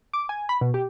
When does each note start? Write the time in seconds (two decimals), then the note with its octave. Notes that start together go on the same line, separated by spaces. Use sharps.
0.13 D6
0.29 G#5
0.49 B5
0.61 B2
0.74 G4